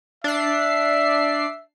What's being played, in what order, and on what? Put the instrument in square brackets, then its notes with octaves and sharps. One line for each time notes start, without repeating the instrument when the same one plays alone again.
[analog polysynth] D4 C7 [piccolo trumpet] E5